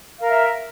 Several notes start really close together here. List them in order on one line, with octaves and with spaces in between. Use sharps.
F5 A#4 E5